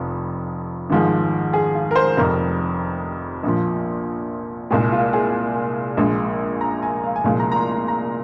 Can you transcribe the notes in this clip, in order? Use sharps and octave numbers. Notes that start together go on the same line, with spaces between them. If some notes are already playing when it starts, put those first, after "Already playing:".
Already playing: F1 F2 F3
G#1 G#2 F3 G#3
G#4
F4
A#4
C5
F1 F2 C3 A#4
A#1 A#2 F3
C2 A#2 G#3 G#4
F4
G#4
A#1 A#2 G#3
A#5
G#5
F5
G#5
C2 A#2 F3 G#3 F5
A#5
A#5
C6
A#5
A#5